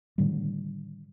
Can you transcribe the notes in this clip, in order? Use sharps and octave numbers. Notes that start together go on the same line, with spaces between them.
A2 D3 D#3 G3